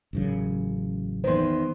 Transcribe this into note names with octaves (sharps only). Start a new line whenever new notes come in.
A1 F#2 C#3
E2 D#3 C5 C6